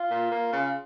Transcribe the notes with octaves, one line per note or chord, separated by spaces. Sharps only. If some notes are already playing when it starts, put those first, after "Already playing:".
Already playing: F4
A#2
A#3
C#3